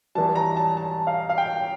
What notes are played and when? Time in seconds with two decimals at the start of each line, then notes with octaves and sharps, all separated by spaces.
0.15 E2 E3 G3 A5
0.35 A#5
0.57 A5
0.77 A5
1.07 F5
1.29 F5
1.38 G5